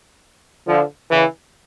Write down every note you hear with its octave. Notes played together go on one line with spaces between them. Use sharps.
D3 F3
C#3 E3